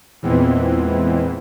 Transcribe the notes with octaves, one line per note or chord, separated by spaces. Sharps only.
E2 A#2 E3 G#3 B3 C4